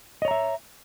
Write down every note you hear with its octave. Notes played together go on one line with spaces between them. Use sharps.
C#5 D#5 E5 A#5